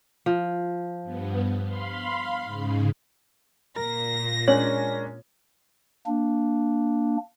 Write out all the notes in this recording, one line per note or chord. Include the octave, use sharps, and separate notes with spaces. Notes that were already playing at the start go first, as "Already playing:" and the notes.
F3
G2 B3
F5 B5 C6
G#2 C#3
A#2 A#4 A#6
G#3 A#3 C#4 D4 C#5
A#3 D4